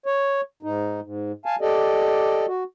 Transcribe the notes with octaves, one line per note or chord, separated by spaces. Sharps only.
C#5
G#2 D#4
G#2
F5 G#5 A5
G4 A4 D5 D#5
F#4